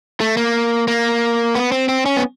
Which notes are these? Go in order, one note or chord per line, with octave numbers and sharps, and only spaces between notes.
A3
A#3
A#3
B3
C4
C4
C#4
B3